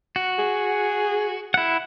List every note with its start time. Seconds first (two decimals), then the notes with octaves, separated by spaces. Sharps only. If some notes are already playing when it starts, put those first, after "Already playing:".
0.16 F#4
0.39 G#4
1.54 E4 F#5